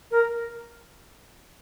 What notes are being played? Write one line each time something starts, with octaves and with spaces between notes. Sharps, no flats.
A#4